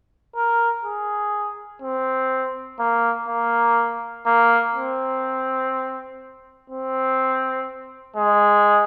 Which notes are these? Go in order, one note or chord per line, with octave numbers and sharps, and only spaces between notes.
A#4
G#4
C4
A#3
A#3
A#3
C4
C4
G#3